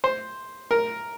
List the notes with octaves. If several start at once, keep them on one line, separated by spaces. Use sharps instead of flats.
C5
A#4